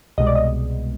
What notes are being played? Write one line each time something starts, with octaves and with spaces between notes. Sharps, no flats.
C2 B2 G#3 D#5
D5
D#5